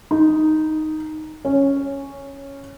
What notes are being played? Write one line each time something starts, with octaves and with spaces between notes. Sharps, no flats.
D#4
C#4